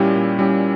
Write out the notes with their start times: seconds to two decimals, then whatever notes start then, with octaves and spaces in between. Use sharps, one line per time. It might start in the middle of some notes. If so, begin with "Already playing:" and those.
Already playing: A#2 G3 C#4 E4 G4
0.15 A#2
0.39 G3 C#4 E4 G4